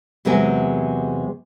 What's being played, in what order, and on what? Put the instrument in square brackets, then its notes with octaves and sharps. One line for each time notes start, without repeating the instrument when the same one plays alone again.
[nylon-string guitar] E2 C3 F#3 G#3 A#4 G#5